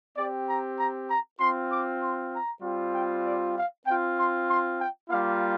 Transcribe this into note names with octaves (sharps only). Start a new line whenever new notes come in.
C4 G4 D5
A#5
A#5
A#5
C4 F4 C6
D6
C6
A#5
G3 C4 F4
G5
D5
F5
C4 F4 G5
C6
C6
G5
G3 A#3 F4 F5